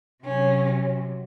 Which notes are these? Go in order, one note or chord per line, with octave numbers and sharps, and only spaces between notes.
C3 F#3 C#4